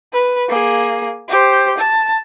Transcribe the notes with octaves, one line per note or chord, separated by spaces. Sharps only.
B4
A#3 G#4
G4 C5
A5